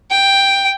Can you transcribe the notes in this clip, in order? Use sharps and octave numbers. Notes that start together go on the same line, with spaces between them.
G5